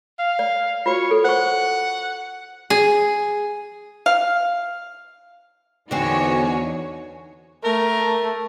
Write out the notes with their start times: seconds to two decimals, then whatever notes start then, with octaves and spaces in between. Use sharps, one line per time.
0.19 F5
0.39 D5
0.86 F4 F#4 C#5
1.11 A4
1.25 C5 F#5 C#6
2.70 G#4
4.06 F5
5.91 E2 D3 C4 D#4 F#4 C#5 G#5
7.64 A3 A#4